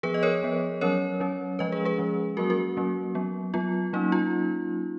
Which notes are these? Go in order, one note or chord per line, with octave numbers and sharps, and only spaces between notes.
F3 B3 G#4 B4
D#5
A#4 C#5
F3 B3
F#3 C#4 A#4 C#5
F#3 C#4
F3 G#3 C#4 B4 D#5
G#4 B4
G#4 B4
F3 G#3 C#4
F#3 A#3 C#4 F#4 A#4
F#4 A#4
F#3 A#3 C#4
F#3 B3
F#3 B3 F4
F#3 A#3 C#4 D#4
F4